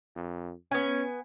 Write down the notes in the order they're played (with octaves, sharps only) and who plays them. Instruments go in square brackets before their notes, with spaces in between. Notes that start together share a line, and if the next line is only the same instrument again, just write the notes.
[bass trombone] F2
[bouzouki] B3 G#5 [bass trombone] C#4